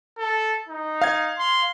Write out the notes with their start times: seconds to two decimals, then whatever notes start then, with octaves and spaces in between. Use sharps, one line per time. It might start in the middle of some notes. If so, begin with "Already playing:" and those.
0.18 A4
0.69 D#4
1.01 F5 G#6
1.39 C6